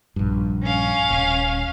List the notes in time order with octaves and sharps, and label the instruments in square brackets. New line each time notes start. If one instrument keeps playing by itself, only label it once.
[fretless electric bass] A#1 G2
[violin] C#4 F5
[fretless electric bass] D#1